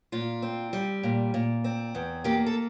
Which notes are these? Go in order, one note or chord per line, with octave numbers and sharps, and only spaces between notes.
A#2 F4
C4
G3
A#2
A#2
C4
E2
A#3 G4
A4